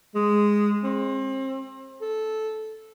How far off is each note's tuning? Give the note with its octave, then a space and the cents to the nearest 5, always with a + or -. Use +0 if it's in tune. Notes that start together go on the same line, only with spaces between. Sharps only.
G#3 -5
C4 +35
A4 -10